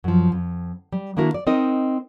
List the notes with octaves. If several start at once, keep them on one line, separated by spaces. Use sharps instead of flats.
F#2 F3
F2
G3
D#3 A#3 D4 E4 F#4 A#4
D5
C4 D#4 A#4 D#5